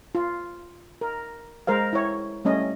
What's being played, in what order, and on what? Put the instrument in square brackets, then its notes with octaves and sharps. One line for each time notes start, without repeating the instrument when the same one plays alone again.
[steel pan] F4
A#4
G#3 A#4 C5 F5
E4 C#5
G3 A3 C#4 D#5